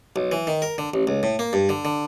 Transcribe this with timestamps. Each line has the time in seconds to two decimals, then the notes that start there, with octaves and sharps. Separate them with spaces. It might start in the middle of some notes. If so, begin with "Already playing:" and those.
0.16 B1
0.32 E3
0.47 D#3
0.62 A#4
0.78 D3
0.94 A1
1.07 C#2
1.23 A2
1.39 A#3
1.53 G2
1.69 D3
1.85 D3